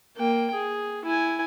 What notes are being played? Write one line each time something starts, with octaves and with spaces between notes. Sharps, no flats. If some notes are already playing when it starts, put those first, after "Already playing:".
A#3 G5
G#4
E4 G#5